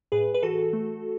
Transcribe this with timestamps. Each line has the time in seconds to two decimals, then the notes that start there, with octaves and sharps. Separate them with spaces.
0.12 A2 G#4 B4
0.34 B4
0.43 E3 F#4 A4
0.73 A3